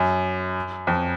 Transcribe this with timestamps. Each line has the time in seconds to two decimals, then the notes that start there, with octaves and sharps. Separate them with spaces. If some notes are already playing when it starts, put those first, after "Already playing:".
Already playing: F#2
0.87 F2